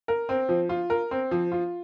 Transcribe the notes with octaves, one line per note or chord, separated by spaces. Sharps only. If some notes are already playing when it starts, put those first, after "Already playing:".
A#4
C4
F3
F4
A#4
C4
F3
F4